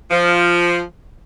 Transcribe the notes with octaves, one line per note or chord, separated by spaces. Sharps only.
F3